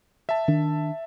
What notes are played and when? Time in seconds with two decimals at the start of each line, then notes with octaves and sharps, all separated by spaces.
0.29 E5 A5
0.48 D#3 D4